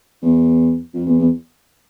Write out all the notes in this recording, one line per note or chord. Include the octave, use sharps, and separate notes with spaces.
E2
F2
E2
E2